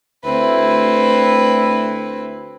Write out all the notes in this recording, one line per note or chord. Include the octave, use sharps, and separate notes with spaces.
D2 C4 E4 B4